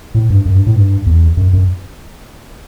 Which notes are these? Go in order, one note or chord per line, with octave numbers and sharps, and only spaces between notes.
A2
G2
F#2
G2
A2
G2
E2
F#2
F#2